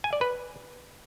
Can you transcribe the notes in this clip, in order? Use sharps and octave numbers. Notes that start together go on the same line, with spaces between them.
G#5
D5
B4